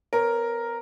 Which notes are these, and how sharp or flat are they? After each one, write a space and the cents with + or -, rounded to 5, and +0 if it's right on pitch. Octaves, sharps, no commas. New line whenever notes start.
B3 +30 A#4 +0 C#5 +0